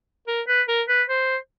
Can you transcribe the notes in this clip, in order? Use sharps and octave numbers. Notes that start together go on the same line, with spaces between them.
A#4
B4
A#4
B4
C5